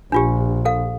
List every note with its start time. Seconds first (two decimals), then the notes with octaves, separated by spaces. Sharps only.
0.12 A#1 D4 F4 G4
0.65 A4 F5